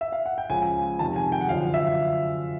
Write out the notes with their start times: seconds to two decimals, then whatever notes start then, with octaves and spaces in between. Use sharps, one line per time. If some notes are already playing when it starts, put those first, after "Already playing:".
0.01 E5
0.12 F5
0.26 F#5
0.38 G5
0.50 C#2 C#3 F3 G#5
0.99 F2 C3 D#3 A5
1.16 G#5
1.32 G5
1.41 F#5
1.48 F#2 D3 F3 F5
1.74 E5